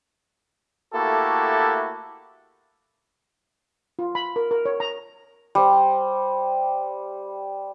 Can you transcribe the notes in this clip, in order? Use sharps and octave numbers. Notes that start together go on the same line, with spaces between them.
A3 A#3 E4 F#4 G4 A4
F4
B5
A#4
A#4
C#5
A#5
G3 C5